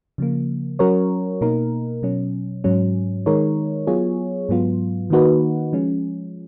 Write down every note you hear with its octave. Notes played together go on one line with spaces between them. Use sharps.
C#3 F3 A#3
F#3 C#4 F#4 A#4 C#5
B2 A#3 D#4 A#4
B2 F#3 C#4
G#2 F#3 C#4
D#3 G#3 D#4 A#4 C#5
F#3 B3 F4 G#4 C#5
G#2 F#3 B3 F4
D#3 A#3 D#4 F#4 B4
F3 G#3 C#4